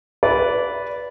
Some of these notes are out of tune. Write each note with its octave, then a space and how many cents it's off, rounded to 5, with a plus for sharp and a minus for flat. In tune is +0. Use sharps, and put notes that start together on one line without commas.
B4 -5 D5 -20